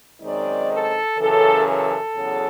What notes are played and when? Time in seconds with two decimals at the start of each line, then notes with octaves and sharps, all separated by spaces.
0.21 F#2 D#3 G#3 C4 D#4 D5
0.69 A4
1.19 F#2 C#3 E3 A4
1.66 A4
2.16 E2 C#3 F#3